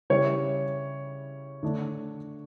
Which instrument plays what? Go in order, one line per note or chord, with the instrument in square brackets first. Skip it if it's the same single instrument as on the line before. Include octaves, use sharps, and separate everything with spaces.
[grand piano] C#3 G3 C#4 E4 [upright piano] C#5
[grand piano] D3 A3 D4